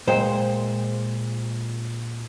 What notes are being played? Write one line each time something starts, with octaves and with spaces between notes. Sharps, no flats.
A#2 G#3 C5 G5